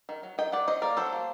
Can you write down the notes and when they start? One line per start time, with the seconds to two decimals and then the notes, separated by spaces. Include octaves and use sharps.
0.09 D#3
0.23 F#3
0.38 D#3 D#5 G5
0.52 D#3 D5 F#5
0.68 F#3 C5 D#5
0.82 A#3 A#4 D5
0.97 F#3 A4 C5
1.13 A#3